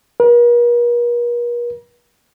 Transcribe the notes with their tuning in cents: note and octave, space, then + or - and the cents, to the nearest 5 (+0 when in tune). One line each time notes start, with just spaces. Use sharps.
A#4 +45